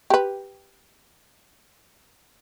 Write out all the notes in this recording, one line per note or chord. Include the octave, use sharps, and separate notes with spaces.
G4 B4